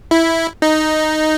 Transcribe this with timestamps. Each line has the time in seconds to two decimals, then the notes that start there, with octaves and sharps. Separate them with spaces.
0.11 E4
0.62 D#4